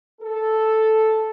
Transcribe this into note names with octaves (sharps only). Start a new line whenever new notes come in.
A4